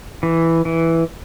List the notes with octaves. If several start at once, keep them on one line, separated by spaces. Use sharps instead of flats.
E3
E3